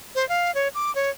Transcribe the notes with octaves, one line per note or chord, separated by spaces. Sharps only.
C5
F5
C#5
D6
C#5